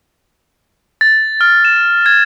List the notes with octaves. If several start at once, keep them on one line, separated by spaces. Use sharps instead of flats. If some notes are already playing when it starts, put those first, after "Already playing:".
A6
F6
E7
G#6